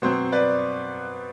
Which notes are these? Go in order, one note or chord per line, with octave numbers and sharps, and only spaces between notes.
B2 F#3 C4 C5
B4 D5